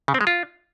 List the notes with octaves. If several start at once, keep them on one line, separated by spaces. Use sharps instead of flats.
C#3
C4
G#3
F4